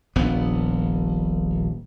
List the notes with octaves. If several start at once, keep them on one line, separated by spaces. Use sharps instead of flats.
D#1 A#1 B3